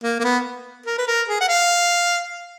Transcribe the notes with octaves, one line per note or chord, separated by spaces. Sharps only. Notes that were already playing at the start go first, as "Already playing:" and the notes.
A#3
A#3
B3
A#4
B4
A#4
G#4
F#5
F5